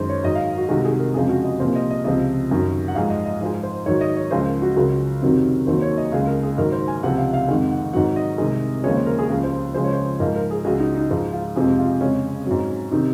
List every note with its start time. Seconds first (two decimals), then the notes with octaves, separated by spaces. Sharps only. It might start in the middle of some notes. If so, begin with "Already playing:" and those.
Already playing: F#2 D#3 G#3 C5
0.09 C#5
0.24 G#2 D#3 F#3 D#5
0.35 F5
0.58 F#4
0.69 C2 C3 D#3 G#3 F#4
0.85 G#4
1.00 A#4
1.14 F2 C#3 F3 G#3 G#4
1.29 F#4
1.44 D#5
1.60 C2 A#2 F3 C5
1.75 D#5
1.91 D#5
2.04 C#2 C3 F3 D#5
2.51 F#2 D#3 F#3
2.88 F#5
2.95 G#2 F3 G#3 F5
3.10 D#5
3.26 D#5
3.41 G#2 F3 G#3
3.63 C5
3.86 G#2 D#3 F#3 C#5
4.01 D#5
4.16 C#5
4.31 C#2 C#3 F3 G#3 C5
4.46 A#4
4.62 F#4
4.76 C#2 C#3 F#3 A#4
5.22 F2 C3 D#3 F#3
5.67 D#2 D#3 F#3 C5
5.82 C#5
5.98 D#5
6.12 C#2 C#3 G#3 F5
6.27 A#4
6.43 G#4
6.58 G#2 D#3 F#3 A#4
6.72 C5
6.88 G#5
7.03 C#2 C3 F3 F#5
7.18 F5
7.34 F5
7.48 F2 D#3 G#3 F#5
7.71 F#5
7.93 G#2 D#3 F#3 F#5
8.16 D#5
8.38 C2 C3 D#3 G#3
8.84 D#2 C#3 F3 G#3 C#5
8.95 C5
9.06 A#4
9.18 G#4
9.30 C#2 C#3 F3
9.44 C5
9.74 C#2 C#3 F3 G#3 C5
9.84 C#5
9.93 C5
10.20 G#2 F3 G#3 A#4
10.35 A#4
10.51 G#4
10.65 C#2 C#3 G#3 F#4
10.80 D#4
10.95 D#4
11.10 G#2 F3 G#3 D#4
11.33 F4
11.56 F2 C3 F3 G#3 G#4
11.79 F4
12.01 F2 C#3 G#3 C#4
12.46 G#2 F#3
12.91 C3 D#3 D#4